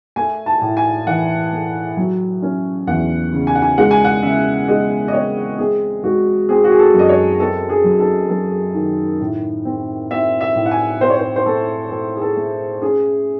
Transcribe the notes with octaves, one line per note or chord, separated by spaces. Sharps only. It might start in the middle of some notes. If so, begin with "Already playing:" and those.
A3 G#5
A5
A2
G#5
E3 F#5
A3
F#3
C#4
E2 F#5
C#3
G#5
F#5
G#5
G#3 F#5
G#5
F#5
C#3 E5
G#3 D#5
D#5
C4 C#5
C4 G#4
G#3 F#4
C4 G#4
F#4
G#4
A4
F#2
D#5
C#5
C4 A4
G#4
F#3
A4
F#3 A4
D#3
A2
C4
C4 E5
E5
A2
F#5
G#5
C4 C5
C#5
C5
C5
A3 A4
A3 A4
G#4
A4
A3
C#4 G#4